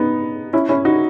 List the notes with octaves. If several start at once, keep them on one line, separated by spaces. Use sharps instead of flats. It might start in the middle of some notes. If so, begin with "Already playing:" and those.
Already playing: B3 D#4
C#4 E4
C#4 E4
D#4 F#4